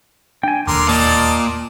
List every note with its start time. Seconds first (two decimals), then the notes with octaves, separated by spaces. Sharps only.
0.43 D4 G5 G#5
0.67 E1 D#2 D3 A#4 C6 D6
0.88 A#2 D5 D#5 A5